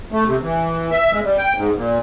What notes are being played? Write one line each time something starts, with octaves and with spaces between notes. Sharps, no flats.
A3
C3
E3
E5
G#3
G3
G5
G#2
A#2